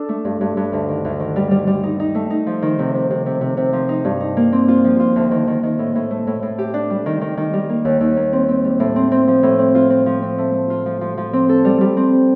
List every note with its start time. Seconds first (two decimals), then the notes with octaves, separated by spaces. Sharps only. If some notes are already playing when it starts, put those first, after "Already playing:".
Already playing: D4 A4
0.09 A3
0.25 G2
0.41 G2
0.57 G2
0.73 D2
0.88 D#3
1.05 D2
1.20 D#3
1.36 G3
1.51 G3
1.67 G3
1.83 D#4
2.00 D#4
2.15 A3
2.30 D#4
2.46 F3
2.62 D#3
2.79 C3
2.94 C3
3.10 C3
3.26 C3
3.41 C3
3.57 C3
3.73 F3
3.89 D#4
4.05 G2
4.20 D#4
4.37 A#3
4.52 C4
4.68 F4
4.84 F3
5.00 F4
5.16 D2
5.31 D#3
5.47 D#3
5.63 D#3
5.79 A2
5.95 A2
6.11 A3
6.27 A2
6.43 A2
6.58 G4
6.74 D4
6.90 G3
7.06 D#3
7.21 D#3
7.37 D#3
7.53 G3
7.69 A#3
7.85 D#2
8.00 D#2
8.17 A#3
8.33 C4
8.48 C4
8.64 G3
8.80 A2
8.96 C4
9.12 C4
9.28 F3
9.43 A2
9.59 C4
9.75 F4
9.90 C4
10.06 F3
10.22 C4
10.38 A3
10.54 A3
10.70 F4
10.86 F3
11.01 F3
11.17 F3
11.33 C4
11.49 A4
11.65 G3
11.81 G3
11.97 C4